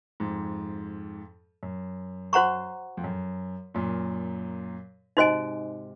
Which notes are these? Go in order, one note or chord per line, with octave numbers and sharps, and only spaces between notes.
F2 G#2
F#2
F#4 C5 F#5 A#5 C#6
F2
F#2
F#2 A#2
G#2 C3 D#4 F#4 C5 D#5 G#5